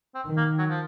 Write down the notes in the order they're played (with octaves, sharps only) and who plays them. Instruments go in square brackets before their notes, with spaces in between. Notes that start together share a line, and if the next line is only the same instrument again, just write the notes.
[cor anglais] C4
[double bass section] D#3
[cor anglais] A#3
F#3
F3